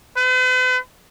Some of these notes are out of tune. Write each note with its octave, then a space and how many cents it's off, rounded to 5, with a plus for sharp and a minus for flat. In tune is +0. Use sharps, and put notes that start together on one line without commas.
B4 +45